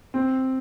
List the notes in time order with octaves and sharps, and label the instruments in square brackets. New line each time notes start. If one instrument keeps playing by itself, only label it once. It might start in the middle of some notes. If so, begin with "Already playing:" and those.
[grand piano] C4